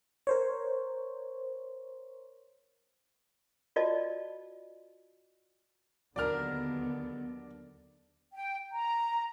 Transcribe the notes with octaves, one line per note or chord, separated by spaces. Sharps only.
A#4 C5 C#5
F4 F#4 D5 D#5 A5
D#2 D3 F#3 B3 D4 A#4 D5 F6
G5
A#5